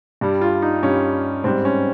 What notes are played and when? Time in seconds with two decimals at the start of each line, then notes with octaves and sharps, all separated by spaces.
0.21 G2 G3
0.41 F4
0.62 D#4
0.83 G2 G3 C#4
1.44 G#2 G3 C4
1.65 C#4